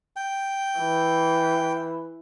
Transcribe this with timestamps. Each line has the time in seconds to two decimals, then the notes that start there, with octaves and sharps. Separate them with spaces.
0.16 G5
0.79 E3